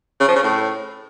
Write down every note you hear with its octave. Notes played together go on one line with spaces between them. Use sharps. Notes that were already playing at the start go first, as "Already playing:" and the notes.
C#3
F3
C#3
A2